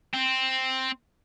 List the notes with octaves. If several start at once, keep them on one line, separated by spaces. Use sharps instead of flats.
C4